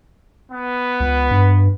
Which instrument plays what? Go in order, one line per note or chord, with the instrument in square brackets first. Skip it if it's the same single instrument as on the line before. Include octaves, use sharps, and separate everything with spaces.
[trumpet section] B3
[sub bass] C#2
G2